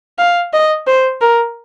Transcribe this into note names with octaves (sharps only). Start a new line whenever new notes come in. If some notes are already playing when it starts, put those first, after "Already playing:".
F5
D#5
C5
A#4